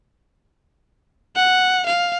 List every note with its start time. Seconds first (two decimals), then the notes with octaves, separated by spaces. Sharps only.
1.36 F#5
1.86 F5